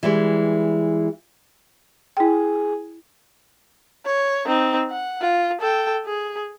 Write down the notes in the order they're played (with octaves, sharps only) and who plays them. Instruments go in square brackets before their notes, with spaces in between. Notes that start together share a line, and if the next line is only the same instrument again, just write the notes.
[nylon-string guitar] E3 G3 G#3
[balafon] E4 G5 [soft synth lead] G#4
[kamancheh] C#5
C4 D#4
F#5
F4
A4 G5
G#4